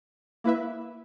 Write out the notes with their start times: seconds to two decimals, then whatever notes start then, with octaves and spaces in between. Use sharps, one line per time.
0.44 A#3 E4 B4 E5